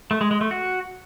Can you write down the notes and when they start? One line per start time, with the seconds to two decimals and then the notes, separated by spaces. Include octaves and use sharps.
0.11 A3
0.21 G#3
0.31 G#3
0.41 A3
0.51 F#4